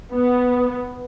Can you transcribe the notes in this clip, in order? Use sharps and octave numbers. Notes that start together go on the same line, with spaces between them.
B3